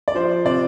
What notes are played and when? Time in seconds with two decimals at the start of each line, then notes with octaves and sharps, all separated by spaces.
0.08 D5
0.15 F3 C5
0.45 C3 D5